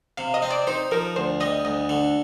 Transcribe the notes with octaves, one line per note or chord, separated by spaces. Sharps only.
C3 F5
D#5
C4
D5
D#4 C5
F3 A#4
D2 C5
G3 D#5
D2 D#5
D3